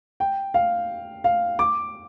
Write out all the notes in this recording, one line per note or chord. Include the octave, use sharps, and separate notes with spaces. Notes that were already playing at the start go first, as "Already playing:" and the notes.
G5
F5
F5
D6